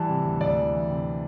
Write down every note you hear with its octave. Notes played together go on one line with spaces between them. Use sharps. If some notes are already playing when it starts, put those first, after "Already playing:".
Already playing: E3 G3 A5
C3
D2
D2 D5
E3
E3
C3